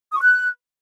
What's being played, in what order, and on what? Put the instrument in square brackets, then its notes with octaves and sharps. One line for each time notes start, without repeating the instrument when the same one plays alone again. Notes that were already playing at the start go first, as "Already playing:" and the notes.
[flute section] D#6
C#6
F#6